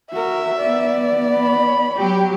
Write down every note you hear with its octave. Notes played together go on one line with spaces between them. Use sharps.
F#4 A#4 E5
B3 D5
B5
F#3 G4